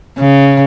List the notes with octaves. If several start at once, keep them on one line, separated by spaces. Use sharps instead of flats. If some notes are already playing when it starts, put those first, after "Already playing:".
C#3